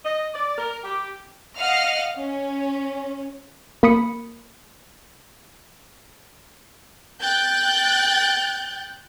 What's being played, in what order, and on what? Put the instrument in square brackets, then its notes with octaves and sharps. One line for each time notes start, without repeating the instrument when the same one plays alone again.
[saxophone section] D#5
D5
A#4
G4
[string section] D#5 F5 F#5 F6
C#4
[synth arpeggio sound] A#3 B5 D#6 C#7
[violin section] G5 F#6 G6 A6